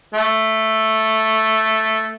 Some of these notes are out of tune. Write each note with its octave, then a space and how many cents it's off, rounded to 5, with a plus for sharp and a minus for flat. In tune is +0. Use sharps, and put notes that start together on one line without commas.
A3 +0